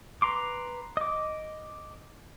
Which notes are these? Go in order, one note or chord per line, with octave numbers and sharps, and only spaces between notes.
B4 A#5 C6 D6
D#5 D6